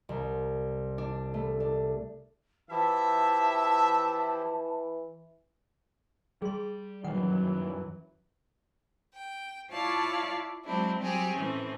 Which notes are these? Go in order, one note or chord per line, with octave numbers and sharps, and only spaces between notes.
C2
D4
A3
D4
E3 F3 E4 G4 E5 A5
G3 G#4 C6
F#2 D#3 E3 F#3 G3 F#5
G5
E4 F4 C#5 D5 F5 A5
F#3 G#3 C4 D4 E4
F#3 G3 C4 G4 G#4
A2 E3 C4 C#4